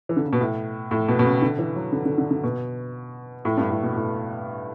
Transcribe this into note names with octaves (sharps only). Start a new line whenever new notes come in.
E3
D3
C#3
B2
A2
A2
B2
B2
C#3
D3
E3
F#3
D3
D3
D3
D3
B2
A2
G2
A2
B2
A2